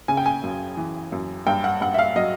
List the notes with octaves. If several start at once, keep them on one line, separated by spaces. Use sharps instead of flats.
C#3 G#5
G5
G#5
F#2
E3
F#2
G2 G5
F#5
G2 F#5
E5
F5
F#3 D#5